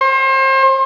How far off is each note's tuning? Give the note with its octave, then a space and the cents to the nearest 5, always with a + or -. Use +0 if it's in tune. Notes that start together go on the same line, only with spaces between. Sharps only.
C5 +35